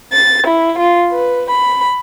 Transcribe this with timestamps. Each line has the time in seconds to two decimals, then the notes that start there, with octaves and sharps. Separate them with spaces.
0.13 A6
0.48 E4
0.78 F4
1.11 B4
1.49 B5